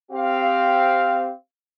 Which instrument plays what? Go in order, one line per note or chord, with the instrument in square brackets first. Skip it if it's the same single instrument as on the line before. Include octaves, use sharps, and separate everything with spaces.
[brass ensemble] C4 G4 F5